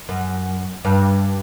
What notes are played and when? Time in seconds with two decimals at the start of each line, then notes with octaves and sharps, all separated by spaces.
0.09 F#2
0.85 G2